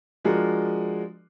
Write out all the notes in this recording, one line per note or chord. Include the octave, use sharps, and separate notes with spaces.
F3 G#3 D4 F#4 A#4